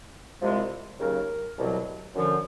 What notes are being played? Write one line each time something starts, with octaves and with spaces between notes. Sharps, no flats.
C2 C3 F3 G#3
D#2 C#3 F#3 A#4
C2 B2 F#3
F#2 D3 F3